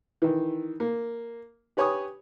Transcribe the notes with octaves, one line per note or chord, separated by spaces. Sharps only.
D#3 E3
A#3
G4 B4 C#5 G#5 C#6 D#6